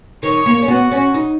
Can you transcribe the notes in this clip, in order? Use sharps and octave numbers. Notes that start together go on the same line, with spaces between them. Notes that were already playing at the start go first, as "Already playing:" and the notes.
D#3 C#5
A#3
C#4
B3 F#4
C#4
D#4